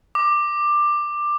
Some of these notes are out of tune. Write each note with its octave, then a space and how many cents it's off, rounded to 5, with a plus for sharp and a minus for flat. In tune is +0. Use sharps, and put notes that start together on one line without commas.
D6 +15